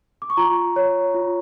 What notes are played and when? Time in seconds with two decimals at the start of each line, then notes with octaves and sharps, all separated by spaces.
0.22 D6
0.30 C#6
0.37 F4 A#5
0.76 C#5
1.15 F4